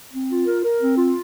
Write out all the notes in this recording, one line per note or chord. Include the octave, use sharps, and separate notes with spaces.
C4
F4
A#4
A#4
C4
F4